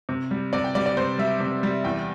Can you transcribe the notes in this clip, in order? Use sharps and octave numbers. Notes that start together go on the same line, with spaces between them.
C3
G3
C3 D5
G5
G3 D5
D5
C3 C5
G3 E5
C3
G3
E2 G5